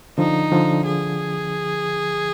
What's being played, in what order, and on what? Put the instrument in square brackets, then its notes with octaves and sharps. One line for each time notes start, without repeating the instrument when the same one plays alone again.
[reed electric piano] D3 F3 [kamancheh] D#4
[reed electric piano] D3 F3
[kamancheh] G#4